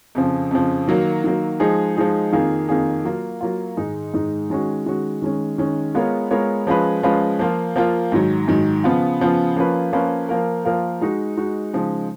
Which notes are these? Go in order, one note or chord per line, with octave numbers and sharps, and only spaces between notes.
F2 C#3 F3
F2 C#3 F3
D#3 F#3 A#3
D#3 F#3 A#3
F3 G#3 D#4 G#4
F3 G#3 D#4 G#4
F2 D#3 A#3 F4 G#4
F2 D#3 A#3 F4 G#4
F#3 A#3 F4
F#3 A#3 F4
G#2 D#3 G#3 D#4
G#2 D#3 G#3 D#4
D#3 G#3 C#4 F#4
D#3 G#3 C#4 F#4
D#3 G#3 C#4
D#3 G#3 C#4
G#3 B3 F4 A#4 C#5
G#3 B3 F4 A#4 C#5
F3 G#3 C#4 F4 B4
F3 G#3 C#4 F4 B4
F3 A#3 F4
F3 A#3 F4
G#2 D#3 F#3
G#2 D#3 F#3
C#3 F3 B3 F4
C#3 F3 B3 F4
F3 A#3 C#4 F4 B4
F3 A#3 C#4 F4 B4
F3 A#3 F4 A#4
F3 A#3 F4 A#4
G#3 D#4 F#4
G#3 D#4 F#4
C#3 F3 G#3 D#4